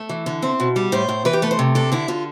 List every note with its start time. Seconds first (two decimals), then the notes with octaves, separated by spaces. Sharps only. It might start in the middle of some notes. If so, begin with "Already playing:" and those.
Already playing: A3
0.09 E3
0.26 D3
0.42 C4
0.60 B2
0.76 G3
0.92 A2 C5
1.09 A2
1.25 E3 B4
1.33 G4
1.42 A3 B4
1.51 C5
1.59 C3
1.75 D4 A4
1.92 D3 E4
2.08 D3 F4